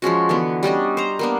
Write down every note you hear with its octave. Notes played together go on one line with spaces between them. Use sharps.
F3 G#3 C#4 F#4
D3 E3 B3
G3 C#4 D4 D#5
C5 A#5
A#3 B3 D4